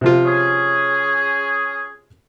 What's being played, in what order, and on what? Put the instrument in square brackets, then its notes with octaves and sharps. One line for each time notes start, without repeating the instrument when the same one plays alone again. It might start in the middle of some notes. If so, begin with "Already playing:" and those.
[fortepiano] C3 F3 F4
[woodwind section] C#4 G#4